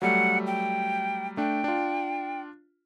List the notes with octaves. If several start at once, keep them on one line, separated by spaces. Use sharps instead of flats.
F#3 G3 A3 F#5
G5
A3 D4 G5
D4 F4